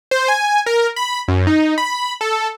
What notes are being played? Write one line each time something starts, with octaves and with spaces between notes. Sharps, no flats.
C5
G#5
A#4
B5
F#2
D#4
B5
A4